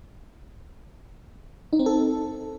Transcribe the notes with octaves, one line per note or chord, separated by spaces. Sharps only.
D#4
C4
A4